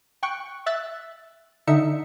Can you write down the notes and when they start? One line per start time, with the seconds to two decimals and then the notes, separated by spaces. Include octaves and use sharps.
0.23 G5 C#6 F#6
0.66 E5 E6 F#6 A6
1.67 D3 D#4 E5 C#7